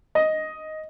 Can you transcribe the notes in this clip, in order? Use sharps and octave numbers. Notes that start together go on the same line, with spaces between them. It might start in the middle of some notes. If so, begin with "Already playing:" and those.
D#5